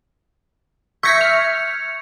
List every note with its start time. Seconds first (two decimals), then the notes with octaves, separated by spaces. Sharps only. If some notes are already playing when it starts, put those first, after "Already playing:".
1.03 E5 C#6 G6 G#6 A#6 B6 C#7
1.21 F6